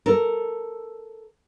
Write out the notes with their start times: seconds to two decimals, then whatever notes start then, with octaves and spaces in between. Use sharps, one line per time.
0.06 A4 A#4